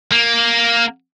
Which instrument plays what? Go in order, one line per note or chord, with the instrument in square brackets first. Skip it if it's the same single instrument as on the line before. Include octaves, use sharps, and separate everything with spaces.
[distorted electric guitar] A#3